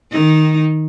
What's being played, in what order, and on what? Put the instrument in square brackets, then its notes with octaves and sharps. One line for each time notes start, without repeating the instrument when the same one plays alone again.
[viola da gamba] D#3 D#4